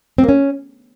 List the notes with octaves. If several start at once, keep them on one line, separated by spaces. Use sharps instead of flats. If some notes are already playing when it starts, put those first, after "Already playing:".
C4
A#3
C#4